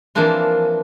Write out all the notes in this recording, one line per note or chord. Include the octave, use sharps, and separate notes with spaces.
E3 F3 A#3 C4 D4 F4